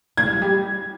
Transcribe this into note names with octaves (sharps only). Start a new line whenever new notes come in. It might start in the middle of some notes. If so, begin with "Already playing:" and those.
G#3 G#6
G3
F3
G3